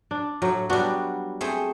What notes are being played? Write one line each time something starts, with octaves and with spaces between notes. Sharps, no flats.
D4
A2 F#3
G3 B3 D4 F#4
A3 C4 G#4